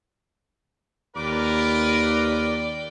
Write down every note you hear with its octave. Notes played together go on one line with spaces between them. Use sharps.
D#2 F4 A#4 B4 D5 G5 D6